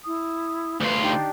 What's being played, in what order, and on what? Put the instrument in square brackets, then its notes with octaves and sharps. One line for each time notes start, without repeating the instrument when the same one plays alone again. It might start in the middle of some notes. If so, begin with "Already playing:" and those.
[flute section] E4 D#6
[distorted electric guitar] D2 F4 [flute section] B4
[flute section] D4 D#4 G4